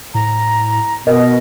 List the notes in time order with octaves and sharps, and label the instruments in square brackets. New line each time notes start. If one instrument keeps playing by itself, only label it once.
[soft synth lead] A2 [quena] A#5
[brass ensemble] B2 [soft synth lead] A#4 [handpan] D#5